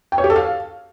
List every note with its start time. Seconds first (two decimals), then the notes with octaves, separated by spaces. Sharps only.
0.12 G5
0.18 C#5
0.24 G4
0.30 A4
0.36 F5